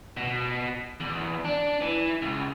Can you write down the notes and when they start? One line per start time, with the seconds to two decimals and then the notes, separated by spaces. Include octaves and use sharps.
0.17 B2
1.01 E2
1.45 D4
1.81 E3
2.22 C#2